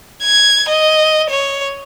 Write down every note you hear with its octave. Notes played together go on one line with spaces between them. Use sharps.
G#6
D#5
C#5